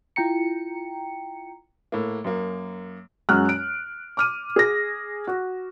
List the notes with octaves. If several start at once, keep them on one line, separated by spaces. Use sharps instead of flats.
E4 F4 G5 A#5 C#7
A2 A#3
F#2 A#3
F#2 G#3 F#4 F6 F#6
D7
D6 F6 D#7
G#4 A#6
F#4